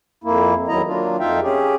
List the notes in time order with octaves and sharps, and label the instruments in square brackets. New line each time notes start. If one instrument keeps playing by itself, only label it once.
[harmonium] F2 A#3 E4
E2 D#3 F#3 E4 D#5 A#5
F#3 A#3 D4 F4
F2 D#4 F4 E5 F5 G5
C#4 G4 G#4